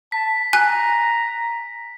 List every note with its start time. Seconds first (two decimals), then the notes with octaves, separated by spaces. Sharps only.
0.12 A5 B6
0.53 G#5 A#5 F#6